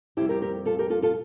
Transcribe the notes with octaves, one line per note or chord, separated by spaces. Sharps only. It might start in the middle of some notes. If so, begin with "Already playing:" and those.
F2 C3 G3 E4 G4
G4 A#4
G4 A#4
F4 A4
G4 A#4
F4 A4
F4 A4